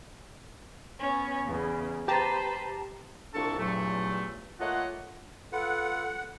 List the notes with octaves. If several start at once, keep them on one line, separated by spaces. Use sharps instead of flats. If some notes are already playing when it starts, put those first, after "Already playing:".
B3 C#4
E2 C#3
G4 B4 C5 A5 A#5
C2 A#2 D4 A4 A5 C#6
E2 G2 A#2 F#3 A3
A3 A#3 F4 C#5 D#5 F#5
F4 A4 B4 F#5